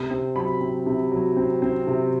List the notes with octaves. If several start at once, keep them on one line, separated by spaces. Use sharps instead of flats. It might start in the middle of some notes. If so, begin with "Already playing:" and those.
Already playing: C3
C4
F#3 B5
C4
C3
F#3
C4
C4
C3